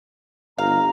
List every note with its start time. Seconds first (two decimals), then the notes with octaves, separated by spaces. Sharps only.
0.58 G1 F5 A#5